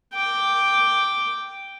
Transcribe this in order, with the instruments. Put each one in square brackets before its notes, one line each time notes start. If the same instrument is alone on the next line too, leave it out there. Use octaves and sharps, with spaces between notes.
[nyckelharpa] G5 D6